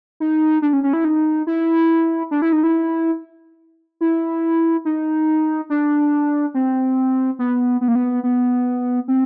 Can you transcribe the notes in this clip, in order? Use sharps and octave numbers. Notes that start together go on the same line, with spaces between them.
D#4
D4
C#4
C#4
E4
D#4
E4
D4
E4
D#4
E4
E4
D#4
D4
C4
B3
B3
A#3
B3
B3
C4